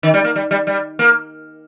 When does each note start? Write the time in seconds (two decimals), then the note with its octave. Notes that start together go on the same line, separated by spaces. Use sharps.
0.03 D#3
0.14 G3
0.24 A#3
0.36 G3
0.51 G3
0.67 G3
0.99 A#3